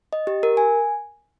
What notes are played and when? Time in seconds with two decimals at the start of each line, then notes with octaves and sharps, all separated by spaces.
0.13 D#5
0.27 G4
0.43 A#4
0.57 G#5